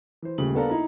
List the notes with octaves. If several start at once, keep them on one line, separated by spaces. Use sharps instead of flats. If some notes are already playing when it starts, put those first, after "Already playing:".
E3 C5
D#1 C#3 A3 F#7
B3 D4 A4 A#4 F5 A#5
D#4 E4 A#5